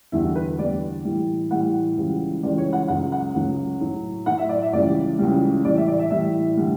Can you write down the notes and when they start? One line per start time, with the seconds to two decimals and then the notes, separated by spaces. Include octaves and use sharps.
0.12 E2 D3 G3 E4
0.25 F#4
0.35 B4
0.59 E2 D3 G3 D5
1.05 A2 E3 G3
1.50 A2 E3 G3 F#5
1.97 C#2 C#3 E3 G3
2.42 C#2 C#3 E3 G3 D5
2.58 C#5
2.73 F#5
2.88 C#2 C#3 F#3 F#5
3.12 F#5
3.35 C#2 C#3 F#3
3.80 A2 F#3
4.26 A2 F#3 F#5
4.38 E5
4.49 D5
4.62 E5
4.73 C#2 C#3 E3 G3 D5
5.19 C#2 C#3 E3 G3
5.64 A2 E3 G3 D5
5.77 E5
5.88 D5
5.99 E5
6.10 A2 E3 G3 E5
6.57 D3 G3